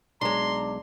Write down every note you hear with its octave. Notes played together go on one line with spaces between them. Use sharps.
B1 G#3 D4 A#5 C6